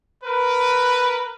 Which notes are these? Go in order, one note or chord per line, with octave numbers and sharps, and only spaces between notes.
A#4 B4